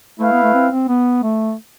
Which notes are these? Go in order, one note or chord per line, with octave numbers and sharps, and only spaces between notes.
A3 E4 B4 F5
B3
A3
C4
C4
B3
A3